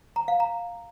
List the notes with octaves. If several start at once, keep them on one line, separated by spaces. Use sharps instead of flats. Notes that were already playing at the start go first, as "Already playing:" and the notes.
A#5
F5
A#5